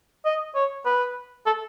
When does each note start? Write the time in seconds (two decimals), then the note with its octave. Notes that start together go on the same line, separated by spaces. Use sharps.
0.25 D#5
0.55 C#5
0.86 B4
1.46 A4